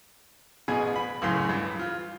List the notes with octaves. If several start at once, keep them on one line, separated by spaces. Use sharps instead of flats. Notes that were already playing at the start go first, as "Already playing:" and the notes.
A1 B2 G#4 G#5
B5
C#2 F#2 A2 C#3 C6
G2 E3
F4